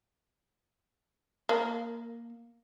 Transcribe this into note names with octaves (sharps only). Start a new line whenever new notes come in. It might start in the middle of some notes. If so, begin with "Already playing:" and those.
A#3